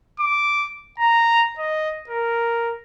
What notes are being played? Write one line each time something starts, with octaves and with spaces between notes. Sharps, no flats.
D6
A#5
D#5
A#4